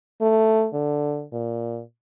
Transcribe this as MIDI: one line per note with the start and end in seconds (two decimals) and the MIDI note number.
0.22 0.68 57
0.73 1.25 50
1.33 1.82 46